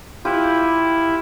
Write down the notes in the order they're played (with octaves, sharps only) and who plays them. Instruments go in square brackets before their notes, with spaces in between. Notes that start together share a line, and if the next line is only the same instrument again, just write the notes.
[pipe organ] E4 [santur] F4 G4 B4